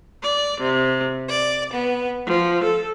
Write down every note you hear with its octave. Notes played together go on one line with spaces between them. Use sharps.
D5
C3
D5
B3
F3
A4